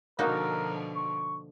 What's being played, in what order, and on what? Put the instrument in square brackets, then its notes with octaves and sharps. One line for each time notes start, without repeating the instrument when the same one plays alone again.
[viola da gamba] B2 D3 F3 [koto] A#3 D#4 F#4 [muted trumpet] A#4
[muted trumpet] C#6